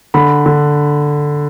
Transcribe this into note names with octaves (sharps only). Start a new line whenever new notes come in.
D3 B5
D3